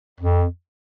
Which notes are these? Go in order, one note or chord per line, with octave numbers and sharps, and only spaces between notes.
F2